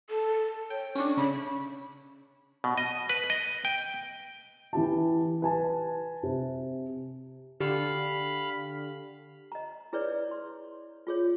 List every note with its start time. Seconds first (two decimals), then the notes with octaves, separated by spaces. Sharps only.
0.10 A4
0.70 C#5 G5
0.95 C#4 D4 C#6
1.17 C#3 B5
2.64 B2
2.78 D#5
3.09 B4
3.30 D#5
3.65 G5
4.73 E3 G4 A5
5.42 B4 G#5 A5
6.23 C3
7.60 D3 G4 F5 B5
9.52 D#5 A#5
9.93 E4 G#4 B4 C#5 D5
10.31 C6
11.07 F4 G#4 C#5